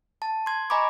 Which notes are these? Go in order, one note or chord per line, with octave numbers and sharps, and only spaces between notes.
A5
C6 G#6
D#5 G#5 A#5 B5 C#6 D6